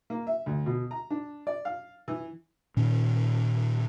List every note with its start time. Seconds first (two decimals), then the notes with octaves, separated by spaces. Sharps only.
0.10 A#3
0.27 E5
0.46 D2
0.66 B2
0.91 A#5
1.10 D4
1.47 D5
1.65 F5
2.08 E3
2.77 A#2 D#3 C#4